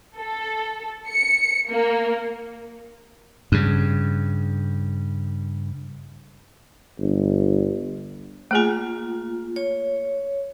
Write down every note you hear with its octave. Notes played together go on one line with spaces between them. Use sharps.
A4
C#7
A#3
G2 C#3
G1
A3 A#3 F4 G#4 G#5
C#5